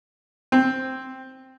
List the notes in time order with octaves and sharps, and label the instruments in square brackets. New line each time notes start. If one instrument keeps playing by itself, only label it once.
[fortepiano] C4